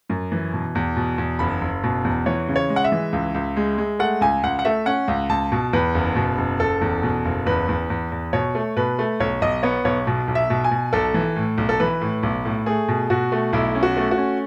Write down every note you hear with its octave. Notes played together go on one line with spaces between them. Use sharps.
F#2
E3
B2
E2
B2
E2
F#1 B5
F#1
B2
E2
E3 C#5
C#3
C#5
G#3
F#5
E5
E3
C#2
C#2
G#3
G#3
A3 F#5
C#2 G#5
C#2 F#5
F#5
A3 E5
C#4 F#5
C#2
C#2 A5
B2
E2 B4
F#1
B2
F#1
F#1 A4
E2
B2
F#1
E2 B4
E2
E2
E2
B2 C#5
A3
B2 B4
A3
B1 C#5
B1 D#5
B3 C#5
B1 C#5
B2
B1
E5
B2
G#5
B2
B1 A4
E3
A2
B1
A4
E3 B4
A2
B1
A2
A3 G#4
B2
B2 F#4
A3
B1 E4
C#4
F#4
A3
F#4
C#4